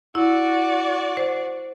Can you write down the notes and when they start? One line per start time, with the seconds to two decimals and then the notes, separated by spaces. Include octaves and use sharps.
0.15 E4 F#4 D5
1.17 C5